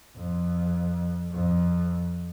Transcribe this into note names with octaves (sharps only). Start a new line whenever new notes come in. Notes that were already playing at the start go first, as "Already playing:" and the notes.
F2
F2